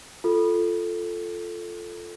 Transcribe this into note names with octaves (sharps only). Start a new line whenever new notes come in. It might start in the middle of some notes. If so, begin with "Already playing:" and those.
F4 A4